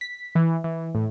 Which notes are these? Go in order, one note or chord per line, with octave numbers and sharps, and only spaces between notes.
B6
E3
E3
A2